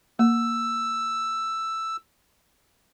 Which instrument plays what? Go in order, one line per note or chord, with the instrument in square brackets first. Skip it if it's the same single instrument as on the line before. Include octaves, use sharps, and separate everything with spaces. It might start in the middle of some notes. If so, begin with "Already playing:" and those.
[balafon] A#3 [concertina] E6